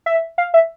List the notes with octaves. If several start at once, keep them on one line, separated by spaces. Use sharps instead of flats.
E5
F5
E5